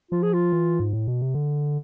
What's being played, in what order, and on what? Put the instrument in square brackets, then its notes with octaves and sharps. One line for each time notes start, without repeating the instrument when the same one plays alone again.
[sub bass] F3 [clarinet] F4
[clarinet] G#4
F4
[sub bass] E3
G#2
A2
B2
C3
D3